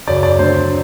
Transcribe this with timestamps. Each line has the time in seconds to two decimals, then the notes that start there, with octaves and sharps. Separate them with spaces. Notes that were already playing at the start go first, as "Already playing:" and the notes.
0.07 F#2 C#3 F#3 D5
0.23 D5
0.39 D2 D3 F#3 A3 C5